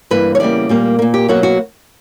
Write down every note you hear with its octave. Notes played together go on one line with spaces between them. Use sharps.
G2 E3 A#3 B4
C#5
E2 C#3 G3 A#3 D5
A#2 G3 A#3
A#2 A#3
G4
B2 F#3 A#3 F#4
F#4